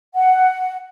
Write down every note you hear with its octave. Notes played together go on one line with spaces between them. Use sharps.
F#5